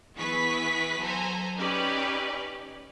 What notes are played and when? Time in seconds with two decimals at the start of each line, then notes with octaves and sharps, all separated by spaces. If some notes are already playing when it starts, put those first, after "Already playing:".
0.18 E3 B3 G#4 B4 C#6 B6
1.00 F#3 A4 C5 G#5 A#5
1.58 C#4 D#4 G4 B4 D5